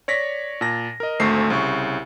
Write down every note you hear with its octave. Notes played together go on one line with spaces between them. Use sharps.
C#5 D5 A#6 B6
A#2 A5 A#6
A#4 D#5
G#1 D2 A3 C5 C#6 C7
C2 C#3 C#6